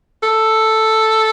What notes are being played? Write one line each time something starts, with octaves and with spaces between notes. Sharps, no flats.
A4